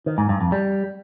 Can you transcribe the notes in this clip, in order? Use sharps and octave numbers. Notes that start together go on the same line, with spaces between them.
D#3
G#2
G2
F2
G3